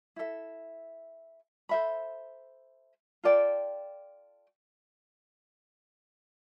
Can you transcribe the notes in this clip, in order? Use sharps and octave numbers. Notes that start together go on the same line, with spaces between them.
E4 A4 E5
A4 C5 E5 B5
F4 A4 D5 G5